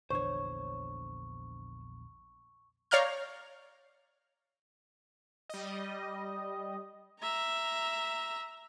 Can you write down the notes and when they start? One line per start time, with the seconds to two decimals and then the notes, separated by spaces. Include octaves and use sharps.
0.10 A#1 E2 D3 C5 C#5 C#6
2.91 C#5 D5 F5 A#5 F6 G6
5.49 G3 D#5
7.20 E5 A#5